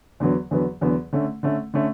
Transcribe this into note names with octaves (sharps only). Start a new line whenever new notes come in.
E2 D3 F#3 B3
E2 D3 F#3 B3
E2 D3 F#3 B3
D3 A3 C#4
D3 A3 C#4
D3 A3 C#4